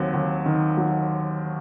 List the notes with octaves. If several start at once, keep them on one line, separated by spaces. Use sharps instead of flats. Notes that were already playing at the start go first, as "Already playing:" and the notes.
Already playing: D#2 F#3 C4
D#2
D#3
F#3